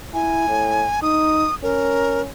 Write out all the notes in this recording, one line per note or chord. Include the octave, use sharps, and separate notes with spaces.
E4 G#5
A2
D#4 D#6
C#4 A#4